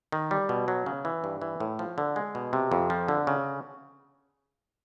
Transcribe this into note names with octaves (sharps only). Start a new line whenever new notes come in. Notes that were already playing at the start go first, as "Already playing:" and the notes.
D#3
G3
B2
F#3
C#3
E3
G2
E3
A2
F3
D3
G#3
B2
C3
F2
F3
D3
C#3